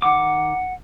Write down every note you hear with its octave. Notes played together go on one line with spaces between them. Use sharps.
D#3 F#5 D6